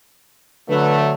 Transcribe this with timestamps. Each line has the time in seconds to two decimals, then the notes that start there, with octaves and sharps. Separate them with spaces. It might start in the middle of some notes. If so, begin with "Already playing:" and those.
0.69 D3 F#3 A3 B4